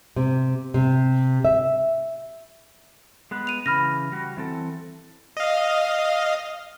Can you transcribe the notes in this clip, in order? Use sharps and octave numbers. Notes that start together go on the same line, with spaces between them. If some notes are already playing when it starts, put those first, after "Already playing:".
C3
C3
E5
G#3 B3 B4
D#7 F7
C#3 E3 B5 F6 A#6
G3 F#4
E3 C4 A4
D#5 F5